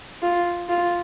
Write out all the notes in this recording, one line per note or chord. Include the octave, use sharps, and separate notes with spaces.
F4
F4